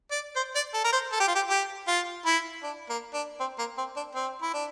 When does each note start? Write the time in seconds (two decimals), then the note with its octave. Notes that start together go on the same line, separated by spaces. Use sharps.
0.12 D5
0.36 C5
0.55 D5
0.74 A4
0.84 A#4
0.93 C5
1.12 A4
1.20 G4
1.28 F4
1.35 G4
1.50 G4
1.88 F4
2.26 E4
2.63 D4
2.90 A#3
3.14 D4
3.40 C4
3.59 A#3
3.78 C4
3.96 D4
4.15 C4
4.42 E4
4.54 D4